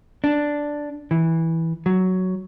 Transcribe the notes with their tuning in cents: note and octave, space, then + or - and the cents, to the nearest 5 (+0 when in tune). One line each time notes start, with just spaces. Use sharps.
D4 +0
E3 -10
F#3 +5